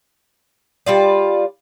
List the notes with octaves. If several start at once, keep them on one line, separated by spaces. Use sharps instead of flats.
G3 F4 D5